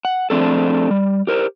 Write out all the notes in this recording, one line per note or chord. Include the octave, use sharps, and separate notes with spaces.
F#5
F3 A3 C4 D4 G#4 A4
G3
G4 A#4 C5